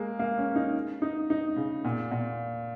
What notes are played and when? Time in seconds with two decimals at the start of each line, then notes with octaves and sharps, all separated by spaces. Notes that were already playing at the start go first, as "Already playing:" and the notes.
Already playing: G#3 A#3
0.19 A#3
0.38 C#4
0.56 D#4
1.02 D#4
1.30 D#4
1.56 C#3
1.85 A#2
2.11 A#2